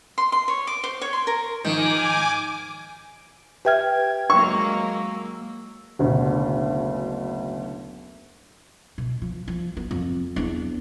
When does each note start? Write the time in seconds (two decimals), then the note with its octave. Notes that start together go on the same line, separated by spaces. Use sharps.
0.18 C6
0.32 C6
0.48 C#5
0.67 D6
0.84 C5
1.01 C#5
1.13 C6
1.27 A#4
1.64 G#2 D#3 F3 G#5 D6
3.65 G4 B4 E5 G5 F6 G#6
4.30 F#3 G#3 A#3 C#6 E6
5.99 F#1 D2 B2 D3
8.98 B2
9.22 F3
9.48 F3
9.77 B3
9.91 F2
10.36 E2 D4